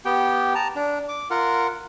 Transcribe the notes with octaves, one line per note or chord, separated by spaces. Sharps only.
B3 G4 G5
A5 A#5
D4
D6
F4 A#4 F#5